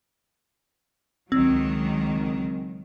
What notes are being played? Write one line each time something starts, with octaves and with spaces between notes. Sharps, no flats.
C#2 D#3 F#3 C4